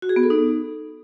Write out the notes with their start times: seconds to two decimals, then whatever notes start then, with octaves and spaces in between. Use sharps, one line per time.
0.02 F#4
0.09 G#4
0.16 B3
0.23 A4
0.30 D#4